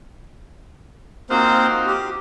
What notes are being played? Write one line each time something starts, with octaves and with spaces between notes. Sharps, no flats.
A#3 C4 D#4 F4 F#4 C5
G4